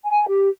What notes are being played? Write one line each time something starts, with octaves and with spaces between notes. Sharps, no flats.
G#5
G4